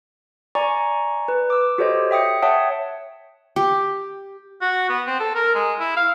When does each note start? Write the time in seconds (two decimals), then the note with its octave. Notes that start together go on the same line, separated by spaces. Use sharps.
0.55 D5 G#5 A#5 C#6
1.28 B4
1.50 D6 E6
1.78 F#4 G4 A4 C5 C#5 D#5
2.11 E5 G5 D#6 C#7
2.42 C#5 E5 F#5 G5 A5 D#6
3.56 G4
4.61 F#4
4.90 B3
5.07 C4
5.20 A4
5.35 A#4
5.55 G#3
5.80 E4
5.97 F5